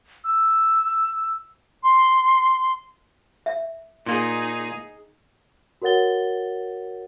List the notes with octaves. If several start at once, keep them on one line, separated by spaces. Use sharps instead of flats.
E6
C6
E5
A#2 A#3 D#4 G#4
F#4 A#4 C#5 F#5 A6 G7